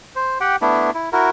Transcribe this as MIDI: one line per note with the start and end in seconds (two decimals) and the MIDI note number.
0.16 0.38 72
0.41 0.56 67
0.41 0.56 78
0.41 0.56 79
0.62 0.90 57
0.62 0.90 59
0.62 0.90 62
0.62 0.90 64
0.95 1.10 64
1.12 1.30 64
1.12 1.30 66
1.12 1.30 70